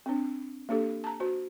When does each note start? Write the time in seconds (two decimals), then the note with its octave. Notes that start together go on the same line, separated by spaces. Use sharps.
0.06 C4 D4
0.69 A#3 D4 G4 A4
1.04 A5 A#5
1.20 F#4 C5